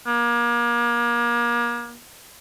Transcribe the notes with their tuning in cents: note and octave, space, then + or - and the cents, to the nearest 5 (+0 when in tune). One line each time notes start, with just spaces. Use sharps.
A#3 +35